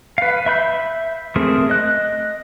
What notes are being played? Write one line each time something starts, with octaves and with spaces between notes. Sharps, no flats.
B4 F5
E5 B5 G6
A3 C4 G#4 A#4
D#5 F#6